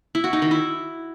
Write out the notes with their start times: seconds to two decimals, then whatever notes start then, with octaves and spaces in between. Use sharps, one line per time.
0.15 E4
0.24 F#4
0.33 D#4
0.42 D#3
0.51 E4